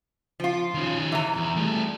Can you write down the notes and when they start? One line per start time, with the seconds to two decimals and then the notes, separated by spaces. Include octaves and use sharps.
0.40 F3 F4
0.74 D#3 C#4
1.12 E3 A#5
1.36 E2
1.56 G3 A3